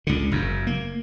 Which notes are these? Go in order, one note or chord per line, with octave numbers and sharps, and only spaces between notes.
C#2 D3
F#1 F#2
A#3